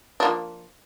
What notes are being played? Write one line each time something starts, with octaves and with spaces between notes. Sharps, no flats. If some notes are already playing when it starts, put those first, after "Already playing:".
F3 A#3 D4